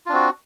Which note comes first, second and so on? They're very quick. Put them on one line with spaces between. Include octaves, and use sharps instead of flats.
F4 D4 C4 F#4